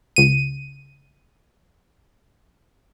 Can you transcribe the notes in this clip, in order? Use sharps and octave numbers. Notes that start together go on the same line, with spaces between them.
C#2 D#7